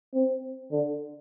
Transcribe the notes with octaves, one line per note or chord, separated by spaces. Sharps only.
C4
D3